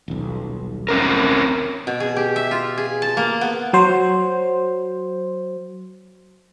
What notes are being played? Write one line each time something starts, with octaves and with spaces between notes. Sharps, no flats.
D#1 B1
C4 C#4 A#4
B2
G#4
G4
E5
F4
G#4
A5
A#3
B3
F#3 C5